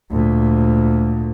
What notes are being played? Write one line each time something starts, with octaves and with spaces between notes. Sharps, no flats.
D2 A#2